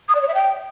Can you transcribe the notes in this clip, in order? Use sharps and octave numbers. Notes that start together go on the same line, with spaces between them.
D#6
D5
C#5
E5
G5